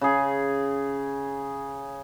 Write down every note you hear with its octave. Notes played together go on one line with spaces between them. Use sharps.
C#3 G#4